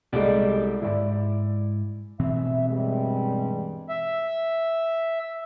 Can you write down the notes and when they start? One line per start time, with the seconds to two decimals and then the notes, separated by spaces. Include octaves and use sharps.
0.13 C2 G#3 G4 A4 D5
0.82 C#2 G#2 E4 D5
2.20 B2 E3 C4 E5
2.69 G2 G3 G#3
3.89 E5